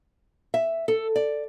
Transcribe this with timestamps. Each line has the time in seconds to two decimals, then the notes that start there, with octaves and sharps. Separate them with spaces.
0.54 E5
0.88 A4
1.16 D5